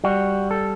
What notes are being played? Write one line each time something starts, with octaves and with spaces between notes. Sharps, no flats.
G3 F#4
A4